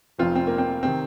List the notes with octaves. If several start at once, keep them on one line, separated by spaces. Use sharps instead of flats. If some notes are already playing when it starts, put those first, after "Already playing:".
F1 F2 F3 C4 F4
C4
A#3
C4
C3 D#3 C4